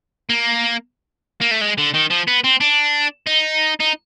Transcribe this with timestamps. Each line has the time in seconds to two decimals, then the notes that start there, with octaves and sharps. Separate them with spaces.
0.29 A#3
1.41 A#3
1.51 A3
1.61 G#3
1.78 D3
1.94 D#3
2.10 F3
2.28 B3
2.44 C4
2.61 D4
3.27 D#4
3.80 D#4